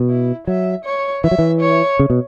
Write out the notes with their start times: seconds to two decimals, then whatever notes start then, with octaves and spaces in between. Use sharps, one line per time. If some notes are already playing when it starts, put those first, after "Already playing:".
Already playing: B2
0.09 E4
0.47 F#3 E5
0.85 C#5
1.24 E3 E5
1.31 F#3
1.39 E3
1.61 C#5
1.99 C#3
2.10 B2